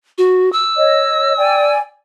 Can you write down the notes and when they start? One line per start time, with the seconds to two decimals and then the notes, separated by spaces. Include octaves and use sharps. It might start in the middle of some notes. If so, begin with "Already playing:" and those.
0.18 F#4
0.52 E6
0.76 C#5 D#5
1.37 D5 G5 G#5